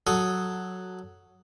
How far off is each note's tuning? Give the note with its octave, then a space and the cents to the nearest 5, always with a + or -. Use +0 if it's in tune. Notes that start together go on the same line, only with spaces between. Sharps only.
F#3 +0 A4 +0 D#6 +0